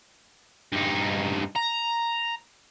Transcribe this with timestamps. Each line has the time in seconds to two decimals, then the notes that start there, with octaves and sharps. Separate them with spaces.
0.72 G2 D#4
1.55 A#5